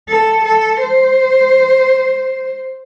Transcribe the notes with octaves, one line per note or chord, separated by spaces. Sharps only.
A4
A4
C5